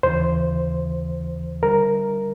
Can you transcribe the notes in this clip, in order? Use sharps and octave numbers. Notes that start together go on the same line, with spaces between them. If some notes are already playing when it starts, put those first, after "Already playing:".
D#2 C#3 E3 C5
D3 G3 A#4